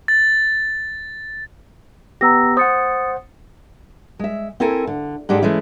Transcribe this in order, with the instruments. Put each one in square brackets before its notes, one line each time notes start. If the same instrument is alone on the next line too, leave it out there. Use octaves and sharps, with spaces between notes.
[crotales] A6
[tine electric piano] B3 G4 [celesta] A#5 E6 A#6
[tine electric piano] C5 F#5 [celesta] D#6 A6 C#7
[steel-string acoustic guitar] G#3 E5
C4 E4 A4 A#4 G#5
D3
G#2 G#3 D4 G4 A4
E3 G#3 A3 C#4 E4